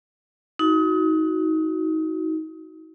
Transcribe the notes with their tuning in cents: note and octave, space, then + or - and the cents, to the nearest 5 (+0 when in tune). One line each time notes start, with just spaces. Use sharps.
D#4 +30 F#4 +0